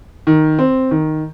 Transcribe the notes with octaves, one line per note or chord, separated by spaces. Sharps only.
D#3
C4
D#3